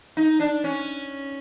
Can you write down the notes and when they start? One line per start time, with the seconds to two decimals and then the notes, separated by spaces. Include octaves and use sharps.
0.17 D#4
0.40 D4
0.64 C#4